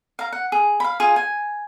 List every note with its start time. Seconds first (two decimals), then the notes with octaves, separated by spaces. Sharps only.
0.19 F5 A#5
0.33 F#5
0.52 G#4
0.80 F5 B5
1.00 F4 G#4
1.16 G#5